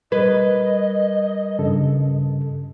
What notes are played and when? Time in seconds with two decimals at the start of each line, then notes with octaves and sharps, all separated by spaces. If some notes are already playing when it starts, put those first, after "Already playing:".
0.12 G3 A#4 B4 D#5 G#6
1.59 G2 C#3 A4